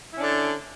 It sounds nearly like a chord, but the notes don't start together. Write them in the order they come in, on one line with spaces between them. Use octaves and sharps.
E4 C#4 D4 D3